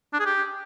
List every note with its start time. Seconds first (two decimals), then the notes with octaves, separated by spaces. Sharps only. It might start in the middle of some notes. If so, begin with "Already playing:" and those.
0.14 D4
0.20 G#4
0.26 G4